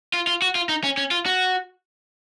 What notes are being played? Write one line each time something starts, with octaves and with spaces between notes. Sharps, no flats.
F4
F4
F#4
F4
D#4
C#4
C#4
F4
F#4